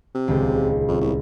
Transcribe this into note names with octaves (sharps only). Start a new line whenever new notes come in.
C3
D#1 C#2
F2
C2